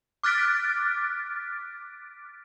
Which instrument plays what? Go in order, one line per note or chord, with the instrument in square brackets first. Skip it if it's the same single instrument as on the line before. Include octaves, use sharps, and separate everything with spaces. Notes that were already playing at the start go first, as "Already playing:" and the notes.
[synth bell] D6 F6 F#6 A6 B6 D7